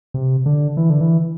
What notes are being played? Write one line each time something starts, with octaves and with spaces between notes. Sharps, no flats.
C3
D3
E3
D3
E3